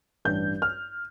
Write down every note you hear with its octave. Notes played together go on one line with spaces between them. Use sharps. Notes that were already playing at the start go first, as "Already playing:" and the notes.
A1 G2 G3 D4 G6
F6